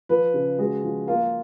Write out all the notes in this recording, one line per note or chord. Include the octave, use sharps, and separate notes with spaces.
F3 B4
C#3
G#3 F#4
F3
A#3 F4